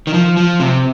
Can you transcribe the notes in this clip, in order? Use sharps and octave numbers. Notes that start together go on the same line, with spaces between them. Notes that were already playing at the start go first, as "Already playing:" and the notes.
D#3
F3
F3
C3